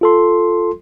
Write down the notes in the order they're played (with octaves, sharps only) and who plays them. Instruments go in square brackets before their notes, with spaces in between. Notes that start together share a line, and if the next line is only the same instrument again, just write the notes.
[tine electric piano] F4 A4 C6